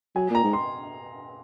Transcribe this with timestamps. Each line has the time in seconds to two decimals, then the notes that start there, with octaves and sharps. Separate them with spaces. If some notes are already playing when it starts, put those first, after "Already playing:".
0.16 F#3 G#5
0.30 A#2 A#5
0.44 G#2
0.53 C6